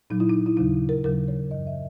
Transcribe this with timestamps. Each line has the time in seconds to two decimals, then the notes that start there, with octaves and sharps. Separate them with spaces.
0.10 A#2 F#3 D#4
0.20 E4
0.29 D#4
0.46 E4
0.57 D#2 C#3 F#3 D#4
0.89 A#4
1.04 D#2 C#3 F#3 A#4
1.28 C#5
1.51 F#2 E3 D#5
1.67 E5